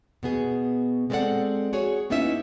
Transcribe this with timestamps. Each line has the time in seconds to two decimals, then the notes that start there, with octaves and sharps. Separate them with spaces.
0.23 B2 B3 G#4
1.10 G#3 B3 C4 A4 D5 F#5
1.73 F#4 G#4 C#5
2.10 A#3 B3 C#4 D#4 E4 E5